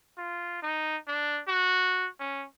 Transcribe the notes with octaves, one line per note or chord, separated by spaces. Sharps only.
F4
D#4
D4
F#4
C#4